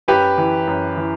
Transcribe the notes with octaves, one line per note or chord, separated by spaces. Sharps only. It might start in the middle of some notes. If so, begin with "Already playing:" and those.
F#2 G4 B4
E3
F#2
E3